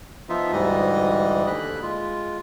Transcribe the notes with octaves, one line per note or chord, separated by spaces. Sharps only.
F3 B3 D#4 F4 E5
D2 G#2 E3 G3 D#5
D#2 D3 B5 F#6
G#3 F4